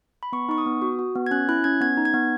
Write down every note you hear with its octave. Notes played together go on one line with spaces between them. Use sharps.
B5
B3 C#6
D#4 C#6
D#6
B3
F#4
F#4
B3
G#6
C#4 F#6
E4 F#6
C#4 G#6
B3 G#6
D#4
G#6
B3